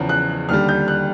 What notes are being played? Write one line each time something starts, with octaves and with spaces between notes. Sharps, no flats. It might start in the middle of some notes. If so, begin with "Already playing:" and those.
Already playing: E2 C#3 F3
F#6
D#2 D3 G3 F6
G6
F#6